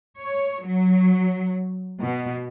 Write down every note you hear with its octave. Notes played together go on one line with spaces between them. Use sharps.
C#5
F#3
B2